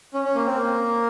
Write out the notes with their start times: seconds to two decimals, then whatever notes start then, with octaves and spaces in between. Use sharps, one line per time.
0.14 C#4
0.25 C#4
0.35 A#3
0.46 C4
0.57 A#3